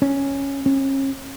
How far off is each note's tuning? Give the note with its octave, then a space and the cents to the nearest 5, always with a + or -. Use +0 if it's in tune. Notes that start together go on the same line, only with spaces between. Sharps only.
C#4 -5
C#4 -35